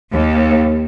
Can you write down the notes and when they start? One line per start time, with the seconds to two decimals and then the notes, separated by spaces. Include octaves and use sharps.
0.11 D#2